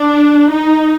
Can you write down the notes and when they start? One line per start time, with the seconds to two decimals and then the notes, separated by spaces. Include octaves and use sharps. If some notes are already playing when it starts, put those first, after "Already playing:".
Already playing: D4
0.51 D#4